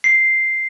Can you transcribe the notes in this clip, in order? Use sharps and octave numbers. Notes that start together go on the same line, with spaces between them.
C7